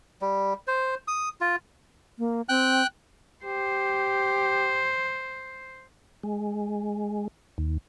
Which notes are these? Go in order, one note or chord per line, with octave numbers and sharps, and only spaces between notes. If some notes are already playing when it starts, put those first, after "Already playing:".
G3
C5
D#6
F4
A#3
C4 G5 F#6
G4 C5
G#3
D#2